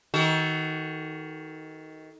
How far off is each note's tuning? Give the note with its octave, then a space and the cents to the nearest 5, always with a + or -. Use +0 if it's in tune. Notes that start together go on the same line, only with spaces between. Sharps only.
D#3 +20 F#4 +25 A4 +0